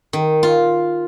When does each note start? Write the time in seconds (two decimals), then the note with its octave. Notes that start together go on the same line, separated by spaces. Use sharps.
0.13 D#3
0.43 F4